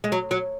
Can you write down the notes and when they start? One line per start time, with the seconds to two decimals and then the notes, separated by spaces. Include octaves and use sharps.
0.04 G#3
0.12 F#3
0.31 F#3